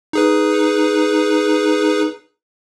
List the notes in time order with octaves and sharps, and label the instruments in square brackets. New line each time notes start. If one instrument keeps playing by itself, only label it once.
[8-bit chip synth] D#4 G#4 B4